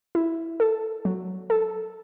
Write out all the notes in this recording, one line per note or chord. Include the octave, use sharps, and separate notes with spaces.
E4
A4
F#3
A4